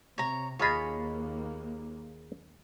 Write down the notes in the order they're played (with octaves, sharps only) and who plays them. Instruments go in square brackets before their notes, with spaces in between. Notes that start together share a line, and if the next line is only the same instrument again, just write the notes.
[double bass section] C3 [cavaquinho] C#5 A#5
[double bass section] D#2 A#3 [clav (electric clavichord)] F4 G#4 D#5 [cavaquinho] C#5 B5